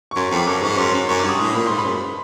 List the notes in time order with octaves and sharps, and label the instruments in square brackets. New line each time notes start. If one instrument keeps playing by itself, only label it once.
[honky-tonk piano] C#6
[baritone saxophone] F#2 [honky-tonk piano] C6
[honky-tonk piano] C#6
[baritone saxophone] F2
[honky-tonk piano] D6
[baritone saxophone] F#2 [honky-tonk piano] D6
[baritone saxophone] G#2 [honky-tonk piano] C#6
[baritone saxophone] F#2 [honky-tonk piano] C6
[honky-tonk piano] C6
[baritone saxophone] F#2
[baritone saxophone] F#2 [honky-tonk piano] C#6
[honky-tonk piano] D6
[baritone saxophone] G2 [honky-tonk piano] D#6
[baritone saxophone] A2 [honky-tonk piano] C#6
[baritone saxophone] A#2 [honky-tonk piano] B5
[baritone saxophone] G#2 [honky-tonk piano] C6
[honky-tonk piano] B5
[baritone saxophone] F#2